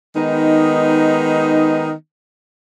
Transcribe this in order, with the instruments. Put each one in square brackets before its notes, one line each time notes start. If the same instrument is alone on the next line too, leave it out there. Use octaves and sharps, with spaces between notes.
[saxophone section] D#3 G#3 B3 D#4